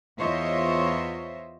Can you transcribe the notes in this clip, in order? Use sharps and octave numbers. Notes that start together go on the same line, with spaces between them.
E2 F4 C5 C#5 D#5 E5